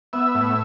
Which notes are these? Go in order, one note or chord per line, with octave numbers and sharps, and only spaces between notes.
B3 E5
A2